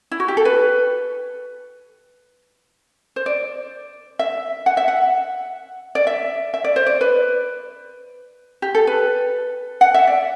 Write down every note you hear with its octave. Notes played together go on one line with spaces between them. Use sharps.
E4
F#4
G4
A4
B4
C5
D5
E5
F#5
E5
F#5
D5
E5
E5
D5
C5
D5
B4
G4
A4
B4
F#5
E5
D5